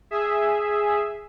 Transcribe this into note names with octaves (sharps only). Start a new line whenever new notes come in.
G#4 E5